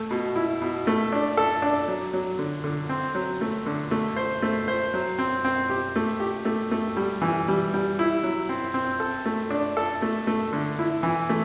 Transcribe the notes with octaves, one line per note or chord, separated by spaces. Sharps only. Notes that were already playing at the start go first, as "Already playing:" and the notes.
Already playing: A3
B2
E4
B2
A3
D4
A4
D4
F#3
F#3
D3
D3
C4
F#3
A3
D3
A3
C5
A3
C5
F#3
C4
C4
G4
A3
G4
A3
A3
G3
E3
G3
G3
E4
F#3
C4
C4
A4
A3
D4
A4
A3
A3
D3
E4
E3
A3